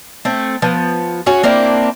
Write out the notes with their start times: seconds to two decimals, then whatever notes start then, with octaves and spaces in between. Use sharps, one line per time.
0.25 A3 C4
0.62 F3 B3
1.26 C#4 F#4 G#4
1.43 A#3 C4 D4 E4